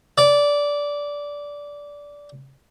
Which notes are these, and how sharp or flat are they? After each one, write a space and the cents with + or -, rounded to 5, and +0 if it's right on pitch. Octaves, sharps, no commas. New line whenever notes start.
D5 -15